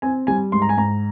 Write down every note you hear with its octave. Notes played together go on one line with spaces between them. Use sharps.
C4 G#5
G3 G#5
G#2 C6
A#5
G#5
G#2 A#5